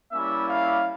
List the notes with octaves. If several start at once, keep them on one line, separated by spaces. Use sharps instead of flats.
G3 A#3 C#4 E4 E5
F5